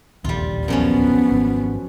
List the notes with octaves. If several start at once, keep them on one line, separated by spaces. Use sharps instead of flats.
E1 A#1 D#2 G3 F4
F#2 F3 B3 C#4
G#1